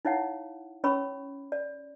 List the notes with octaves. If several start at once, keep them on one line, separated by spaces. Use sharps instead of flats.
D#4 E4 C#5 F5 F#5
C#4 C#5 B5 C#6 E6
D5